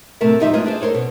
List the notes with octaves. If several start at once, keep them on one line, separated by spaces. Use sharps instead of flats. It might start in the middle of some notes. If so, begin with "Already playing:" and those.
A2 C3 A3 A#4 E5
D#2 F3 G3 D#4 F4 E5
G#3 A#3 F4 B4 D#5
D4 G#4 C5
A4 A#4 C5 C#5
B2